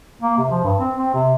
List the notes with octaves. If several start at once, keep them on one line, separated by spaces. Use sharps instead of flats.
A#3
C3
F3
G2
C4
C4
C3